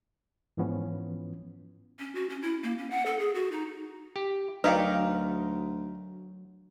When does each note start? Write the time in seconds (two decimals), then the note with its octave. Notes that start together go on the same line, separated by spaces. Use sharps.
0.57 G#2 E3 F3 B3 C#4
1.99 C#4
2.15 F#4
2.29 C#4
2.42 E4
2.63 A#3
2.78 C#4
2.90 F#5
3.06 A4
3.19 G#4
3.35 F#4
3.52 D#4
4.16 G4
4.64 D2 F#3 D#4 A#4 B4 D5 F5 G5